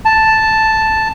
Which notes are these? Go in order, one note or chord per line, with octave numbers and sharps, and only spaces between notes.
A5